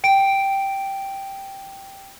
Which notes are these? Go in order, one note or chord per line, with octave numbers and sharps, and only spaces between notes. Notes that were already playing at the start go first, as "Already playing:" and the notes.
G5 D7